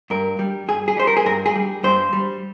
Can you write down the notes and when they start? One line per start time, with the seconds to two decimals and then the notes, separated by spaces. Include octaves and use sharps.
0.10 G2 A#4
0.39 G3
0.68 G2 G#4
0.88 G#4
0.97 G3 C5
1.07 A#4
1.17 G#4
1.26 G2 A#4
1.46 G#4
1.56 G3
1.83 G2 C5
2.13 G3